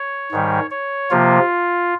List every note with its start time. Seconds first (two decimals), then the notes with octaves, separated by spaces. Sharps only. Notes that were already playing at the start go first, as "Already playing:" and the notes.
Already playing: C#5
0.32 G#2 D#3 G3
0.71 C#5
1.11 C3 F3 A#3 F4